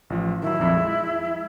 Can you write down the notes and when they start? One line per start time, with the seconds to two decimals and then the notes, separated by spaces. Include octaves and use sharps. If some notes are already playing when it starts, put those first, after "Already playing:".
0.10 A1 F3
0.42 D#3 F#3 E4
0.60 A#1 F2 F3
0.76 G#3